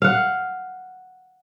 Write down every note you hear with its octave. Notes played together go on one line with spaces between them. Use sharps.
F5 F#5